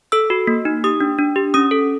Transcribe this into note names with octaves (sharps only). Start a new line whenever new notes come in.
A4 E6
F#4
A#3
D#4
G4 D#6
D4
D4
G4
C#4 D#6
A4